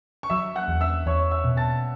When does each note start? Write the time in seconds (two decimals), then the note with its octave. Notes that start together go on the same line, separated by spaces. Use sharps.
0.23 C#6
0.30 F#3 E5 E6
0.55 F#5 F#6
0.68 E2
0.81 E5 E6
1.06 E2 C#5 C#6
1.31 E5 E6
1.44 B2
1.57 A5 A6